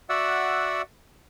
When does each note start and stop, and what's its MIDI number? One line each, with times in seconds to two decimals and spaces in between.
0.09 0.82 66
0.09 0.82 74
0.09 0.82 76
0.09 0.82 78
0.09 0.82 88